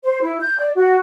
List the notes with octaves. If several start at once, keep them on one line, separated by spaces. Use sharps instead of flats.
C5
E4
G6
D5
F#4